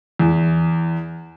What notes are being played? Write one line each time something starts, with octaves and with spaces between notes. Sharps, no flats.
E2